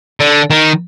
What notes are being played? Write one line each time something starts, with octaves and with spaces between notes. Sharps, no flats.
D3
D#3